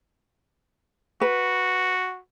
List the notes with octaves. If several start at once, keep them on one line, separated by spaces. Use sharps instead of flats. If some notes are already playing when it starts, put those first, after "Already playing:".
F#4 B4